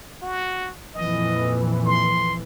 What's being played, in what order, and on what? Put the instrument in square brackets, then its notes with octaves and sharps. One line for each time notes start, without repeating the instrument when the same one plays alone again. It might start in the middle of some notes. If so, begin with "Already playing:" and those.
[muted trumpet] F#4
[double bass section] F2 A#2 E3 [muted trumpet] D#5
[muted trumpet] C6